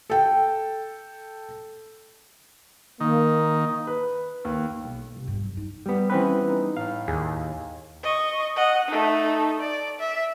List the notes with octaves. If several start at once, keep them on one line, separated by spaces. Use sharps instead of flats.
A4 G5
D#3 A#3
B4
D#2
B1
C3
G2
F#3
D#4
G3 B3
E3 C4 C#4 B4
D#4
A2 F5
D#2 G#4
D#5 C#6
D#5 F#5
A3 D#4
D5
E5